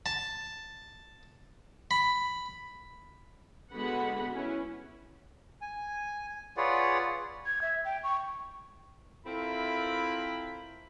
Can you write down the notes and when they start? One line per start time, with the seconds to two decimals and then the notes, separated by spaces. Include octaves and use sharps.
0.06 A5
1.91 B5
3.74 D3 G#3 B3 F#4 F#5 B5
4.34 C#4 E4 B4
5.61 G#5
6.57 F4 G#4 B4 C#5 D5 F#5
7.46 G#6
7.62 E5
7.85 G5
8.04 C#6
9.26 C4 E4 F4 A4 A#4 B5